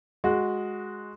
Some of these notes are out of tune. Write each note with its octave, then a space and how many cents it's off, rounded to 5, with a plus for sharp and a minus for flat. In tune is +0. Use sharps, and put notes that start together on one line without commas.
G#3 +0 F#4 -10